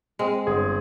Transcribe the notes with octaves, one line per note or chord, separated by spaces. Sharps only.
G#3 C4
G1 G#4